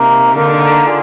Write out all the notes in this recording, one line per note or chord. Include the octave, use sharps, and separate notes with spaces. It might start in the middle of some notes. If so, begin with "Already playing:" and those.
Already playing: C3 A#3 D#4 A#4
D3 A#3 D#4 A#4
F4 G#4 D5